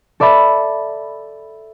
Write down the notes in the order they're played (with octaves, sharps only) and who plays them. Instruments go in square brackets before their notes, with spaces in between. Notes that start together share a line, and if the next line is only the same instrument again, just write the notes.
[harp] A4 D5 E5 B5 A6